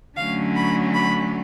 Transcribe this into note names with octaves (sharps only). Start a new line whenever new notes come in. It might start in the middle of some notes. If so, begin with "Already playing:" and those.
D3 F#3 A3 C#4 F5
B5
B5